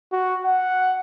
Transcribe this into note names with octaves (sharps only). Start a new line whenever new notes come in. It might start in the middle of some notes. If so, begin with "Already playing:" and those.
F#4
F#5